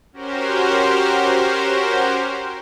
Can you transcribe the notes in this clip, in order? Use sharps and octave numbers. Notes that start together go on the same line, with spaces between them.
C#4 F#4 G4 A#4 C5